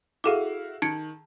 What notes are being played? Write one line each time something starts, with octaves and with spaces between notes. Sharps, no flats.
E4 F#4 G#4 A4 F5 D6
D#3 A5 G#6 C#7